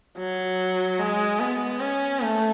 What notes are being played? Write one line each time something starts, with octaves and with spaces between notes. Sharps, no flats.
F#3
G#3
B3
C#4
A3